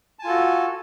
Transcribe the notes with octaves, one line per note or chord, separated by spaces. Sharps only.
F4 F#4 A4 G#5 A5